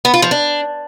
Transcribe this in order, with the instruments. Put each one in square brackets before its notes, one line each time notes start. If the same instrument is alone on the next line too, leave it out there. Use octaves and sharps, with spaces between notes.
[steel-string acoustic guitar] B3
F4
F3
D4